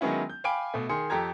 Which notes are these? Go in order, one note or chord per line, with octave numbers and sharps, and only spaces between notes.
D#3 F#3 G#3 B3 C#4 E4
G6
F5 G5 G#5 B5 D6 D7
B2 A3
D#3 G#4 C6 C#7
F2 G4 A4 A#5 G#6